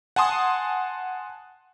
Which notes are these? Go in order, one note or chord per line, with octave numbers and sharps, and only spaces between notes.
F#5 G#5 A5 C6 D#6